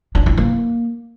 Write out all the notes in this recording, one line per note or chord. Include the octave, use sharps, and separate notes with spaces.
D4
E4
A#3